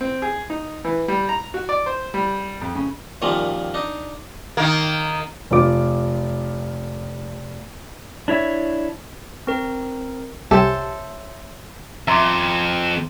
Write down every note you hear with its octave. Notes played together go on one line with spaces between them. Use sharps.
C4
G#4
D#4
E3
G3
A#5
F#4
D5
C5
G3
F2
C#3
F#2 A#2 D#3 F3 G3
D4 D#4
D#3 A#3
F1 F4 D6
D4 E4 C#5 E5
C4 A#4
C2 G4 A4 C5 C#5 E5 G#5
F2 E5 A#5 C6 D6